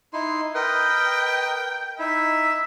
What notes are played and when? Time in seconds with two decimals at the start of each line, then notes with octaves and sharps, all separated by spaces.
0.13 D#4 E4 C6
0.55 A#4 B4 D#5 G5
1.99 D#4 E4 E5